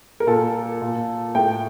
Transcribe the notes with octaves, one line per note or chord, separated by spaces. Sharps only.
A#4
A#2 A4
A#2
A2 G5